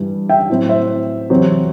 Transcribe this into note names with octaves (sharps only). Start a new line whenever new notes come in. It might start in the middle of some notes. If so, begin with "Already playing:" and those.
Already playing: G2 E3 G3
E5 G5
A2 F#3 C4
C5 E5
E2 C3 F#3 C4